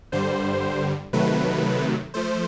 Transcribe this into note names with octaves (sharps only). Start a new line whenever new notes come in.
G2 D3 G3 C5
C3 D#3 F#3 A3 B4
F3 A3 C5